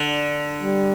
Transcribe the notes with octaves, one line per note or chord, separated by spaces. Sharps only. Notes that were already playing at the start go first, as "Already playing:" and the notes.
Already playing: D3
G3